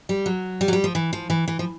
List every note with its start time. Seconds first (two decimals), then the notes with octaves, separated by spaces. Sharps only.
0.09 G3
0.26 F#3
0.61 G3
0.68 F#3
0.73 G3
0.84 F3
0.95 E3
1.13 F3
1.30 E3
1.48 E3
1.59 F3